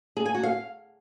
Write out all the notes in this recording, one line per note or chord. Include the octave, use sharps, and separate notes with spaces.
G#4
G#5
F#4
F5